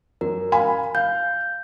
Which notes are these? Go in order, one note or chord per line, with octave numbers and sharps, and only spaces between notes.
F#2 A#4
F5 G#5 B5
F5 G6